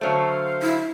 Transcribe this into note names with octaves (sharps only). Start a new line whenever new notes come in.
D3 F#3 A3 C5 F5
E4